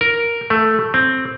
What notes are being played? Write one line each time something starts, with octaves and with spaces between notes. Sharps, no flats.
A#4
A3
C4